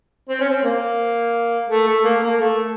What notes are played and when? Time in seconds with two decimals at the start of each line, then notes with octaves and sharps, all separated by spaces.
0.29 C4
0.40 C#4
0.50 C4
0.64 A#3
1.70 A3
1.88 A3
2.04 A#3
2.23 A#3
2.40 A3